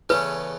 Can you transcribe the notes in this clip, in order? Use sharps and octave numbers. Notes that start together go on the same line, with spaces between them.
E2 C#3 E3 A3 C#4 B4